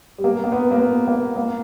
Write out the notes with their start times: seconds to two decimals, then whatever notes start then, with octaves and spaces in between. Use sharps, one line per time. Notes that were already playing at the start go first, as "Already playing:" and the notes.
0.18 G3
0.24 A#3
0.44 A#3
0.52 B3
0.71 A#3
0.80 B3
1.08 A#3
1.36 A#3